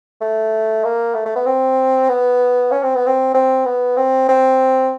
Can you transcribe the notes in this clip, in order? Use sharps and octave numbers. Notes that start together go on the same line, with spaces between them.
A3
A#3
A3
A3
B3
C4
B3
C#4
C4
B3
C4
C4
B3
C4
C4